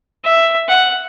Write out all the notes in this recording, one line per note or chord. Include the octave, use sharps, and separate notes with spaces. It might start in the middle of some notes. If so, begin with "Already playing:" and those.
E5
F#5